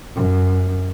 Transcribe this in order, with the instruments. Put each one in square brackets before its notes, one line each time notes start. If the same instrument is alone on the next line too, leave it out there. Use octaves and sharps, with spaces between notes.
[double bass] F#2